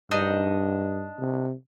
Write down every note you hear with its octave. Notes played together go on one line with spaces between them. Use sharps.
G2 D4 D#4 D#5
C3